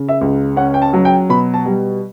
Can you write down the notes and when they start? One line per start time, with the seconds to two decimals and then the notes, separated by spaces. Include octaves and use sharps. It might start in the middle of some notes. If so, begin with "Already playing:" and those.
Already playing: C#3
0.09 E5
0.21 C#2
0.56 C#4 F#5
0.74 G5
0.82 A5
0.93 F#3
1.05 G5
1.29 B2 B5
1.54 A5
1.66 G3